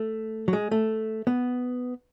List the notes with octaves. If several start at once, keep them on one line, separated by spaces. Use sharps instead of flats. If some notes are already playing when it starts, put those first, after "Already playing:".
Already playing: A3
F#3
G#3
A3
B3